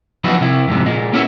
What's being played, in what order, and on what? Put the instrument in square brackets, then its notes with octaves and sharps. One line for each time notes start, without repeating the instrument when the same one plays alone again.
[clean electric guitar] F3 F#3 B3 D#4 E4 F#4
C3 E4
F2 G#2 C3
A#2 G#3
A#3 B3 C#4 D#4 E4 E5